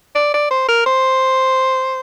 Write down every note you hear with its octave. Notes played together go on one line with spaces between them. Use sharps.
D5
D5
C5
A#4
C5